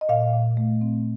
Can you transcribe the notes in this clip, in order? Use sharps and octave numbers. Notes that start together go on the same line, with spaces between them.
D#5
A#2 F5
A#2
A3
C4